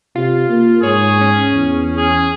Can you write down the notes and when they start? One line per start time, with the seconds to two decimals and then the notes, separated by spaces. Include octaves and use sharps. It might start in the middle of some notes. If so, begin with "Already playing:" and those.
0.15 C3 F4
0.49 A#3
0.83 G#2 G#4 C#5
1.21 C#4
1.54 E2
1.97 G#4